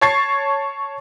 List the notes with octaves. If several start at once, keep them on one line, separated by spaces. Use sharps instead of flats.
C#5 A5 C#6 G#6 A6 C7